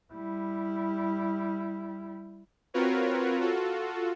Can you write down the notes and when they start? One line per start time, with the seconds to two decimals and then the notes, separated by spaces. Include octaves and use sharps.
0.13 G3 E4
2.74 C4 F4 F#4 A#4 B4 C#5
3.41 F4 F#4 A4